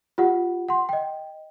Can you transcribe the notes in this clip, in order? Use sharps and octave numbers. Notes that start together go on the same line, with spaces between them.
F4 G4 F#5
F#5 C6
D#5 G5